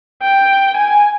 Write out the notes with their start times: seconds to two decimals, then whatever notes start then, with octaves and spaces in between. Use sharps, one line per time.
0.23 G5
0.77 G#5